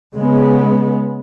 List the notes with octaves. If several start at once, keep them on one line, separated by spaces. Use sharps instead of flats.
C#3 G#3 B3